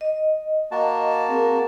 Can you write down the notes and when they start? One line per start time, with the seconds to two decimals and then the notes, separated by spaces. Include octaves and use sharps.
0.01 D#5
0.71 A#3 F#4 A5
1.29 C4 G#4 A#4